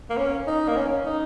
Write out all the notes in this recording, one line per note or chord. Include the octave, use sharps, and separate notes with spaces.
A#3
C#4
D#4
A#3
C#4
D#4